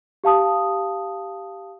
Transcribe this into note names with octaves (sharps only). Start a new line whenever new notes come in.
G4 F5 A5 D#6